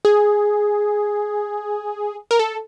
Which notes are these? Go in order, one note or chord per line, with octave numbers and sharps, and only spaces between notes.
G#4
A#4
A4